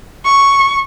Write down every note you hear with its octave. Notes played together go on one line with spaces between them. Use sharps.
C#6